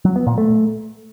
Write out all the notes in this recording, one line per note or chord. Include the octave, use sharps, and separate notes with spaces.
F#3
B3
A#2
A3